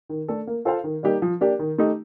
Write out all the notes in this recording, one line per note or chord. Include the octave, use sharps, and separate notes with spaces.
D#3
A3 D4 A4
A#3
F4 A4 C5 F5
D#3
G3 A#3 D#4 G4
F3
A#3 D4 G4
D#3
A3 D#4 G4